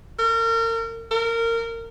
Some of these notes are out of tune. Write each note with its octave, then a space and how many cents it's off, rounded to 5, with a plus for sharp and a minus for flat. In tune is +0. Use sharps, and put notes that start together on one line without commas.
A#4 -35
A#4 -20